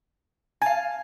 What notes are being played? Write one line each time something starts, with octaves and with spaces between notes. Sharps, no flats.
F5 G#5 A5